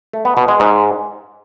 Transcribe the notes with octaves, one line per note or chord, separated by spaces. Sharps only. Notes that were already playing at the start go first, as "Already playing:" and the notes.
A3
B3
B2
G#3
G#2